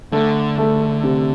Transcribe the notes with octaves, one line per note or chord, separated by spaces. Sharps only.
D3 A3
A3
C3